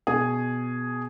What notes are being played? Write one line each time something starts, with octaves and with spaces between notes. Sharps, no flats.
B2 G#4